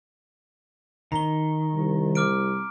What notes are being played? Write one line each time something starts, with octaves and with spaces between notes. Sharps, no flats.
D#3 A#5 G7
C2
D6 F6 D7